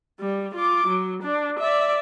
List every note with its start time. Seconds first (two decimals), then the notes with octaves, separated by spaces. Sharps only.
0.20 G3
0.55 F4 D6
0.88 F#3
1.23 D4
1.60 D5 E5